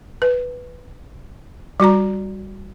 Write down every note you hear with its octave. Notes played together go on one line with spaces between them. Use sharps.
B4
G3 F#4 D5 A#5